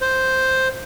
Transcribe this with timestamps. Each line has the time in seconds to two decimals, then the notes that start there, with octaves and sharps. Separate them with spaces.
0.01 C5